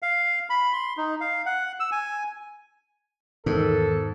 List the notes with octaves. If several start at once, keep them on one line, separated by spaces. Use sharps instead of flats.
F5
B5
C6
D#4
F5
F#5
E6
G#5
E2 G#2 D#3 A4